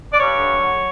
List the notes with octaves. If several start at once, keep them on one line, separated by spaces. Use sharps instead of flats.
D5
G2 C#5
D3
F#3